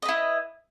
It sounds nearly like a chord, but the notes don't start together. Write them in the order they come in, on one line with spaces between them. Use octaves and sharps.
D#5 B4 E4